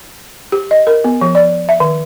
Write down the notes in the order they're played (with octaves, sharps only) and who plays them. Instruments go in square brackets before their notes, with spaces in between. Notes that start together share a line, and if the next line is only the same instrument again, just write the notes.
[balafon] G4
D#5
A#4
B3
F3
D5
E5
D#3